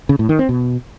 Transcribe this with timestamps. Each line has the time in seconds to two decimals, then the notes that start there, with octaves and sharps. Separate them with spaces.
0.09 C#3
0.19 A2
0.29 D#3
0.39 C4
0.49 B2